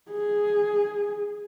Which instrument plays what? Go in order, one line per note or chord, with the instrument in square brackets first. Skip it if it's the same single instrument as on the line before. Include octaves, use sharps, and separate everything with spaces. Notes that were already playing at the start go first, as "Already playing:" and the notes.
[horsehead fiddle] G#4